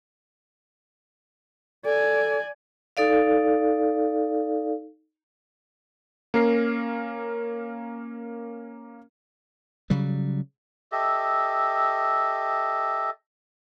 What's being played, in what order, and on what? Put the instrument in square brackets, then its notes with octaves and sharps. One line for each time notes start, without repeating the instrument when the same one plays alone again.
[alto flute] A4 [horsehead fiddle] D5 G#5
[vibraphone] D#4 A4 D5 F5
[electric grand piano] A#3 C#4 A#4 C7
[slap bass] C#3 F#3 G3
[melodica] G4 A4 D#5 E5